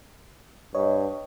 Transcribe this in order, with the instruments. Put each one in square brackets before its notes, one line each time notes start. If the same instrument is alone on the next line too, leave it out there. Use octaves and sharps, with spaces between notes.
[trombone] G2 [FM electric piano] C#5 D#5